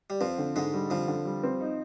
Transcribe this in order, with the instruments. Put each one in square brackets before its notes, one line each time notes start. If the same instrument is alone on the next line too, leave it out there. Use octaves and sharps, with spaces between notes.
[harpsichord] G3
[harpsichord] F2 F3 [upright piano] C4
[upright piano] D3
[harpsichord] G#2 G#3 [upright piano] D3
[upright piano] G3
[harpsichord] F2 F3 [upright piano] D3
[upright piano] D3
G3
C4
D#4